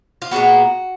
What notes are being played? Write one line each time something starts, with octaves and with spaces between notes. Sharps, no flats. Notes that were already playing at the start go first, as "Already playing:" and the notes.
F4
A#2 G#3 B3 F#4